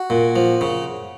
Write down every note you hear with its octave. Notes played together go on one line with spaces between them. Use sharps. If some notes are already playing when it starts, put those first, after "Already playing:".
Already playing: F#4
A#2
F3
C#3